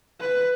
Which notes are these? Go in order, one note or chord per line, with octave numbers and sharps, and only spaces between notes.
B4